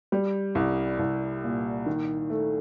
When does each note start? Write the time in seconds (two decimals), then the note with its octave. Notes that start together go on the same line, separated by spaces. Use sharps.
0.12 G3
0.55 C2
0.99 C2
1.44 A#2
1.86 D#3
2.30 A3